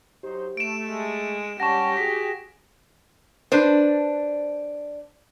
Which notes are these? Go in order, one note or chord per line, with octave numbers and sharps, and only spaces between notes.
F#3 D#4 G4 C5
A3 D7 E7
G#3
G3 C#4 G4 F#5 A5 C#6 A#6 E7
F#4 G#4 B6
D4 B4 C5